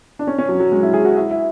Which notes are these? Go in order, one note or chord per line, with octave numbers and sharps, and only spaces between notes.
D4
C#4
C#4
F#3
F#3
G#3
E4
G#4
F#4
E4
E4